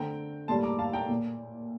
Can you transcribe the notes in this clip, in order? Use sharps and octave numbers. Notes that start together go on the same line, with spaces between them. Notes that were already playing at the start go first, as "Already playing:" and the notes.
Already playing: D3 A3 C4 G5 A#5
A2 G3 A#3 A5 C6
A#5 D6
F5 A5
G5 A#5
A#2